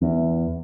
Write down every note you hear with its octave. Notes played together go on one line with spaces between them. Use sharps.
E2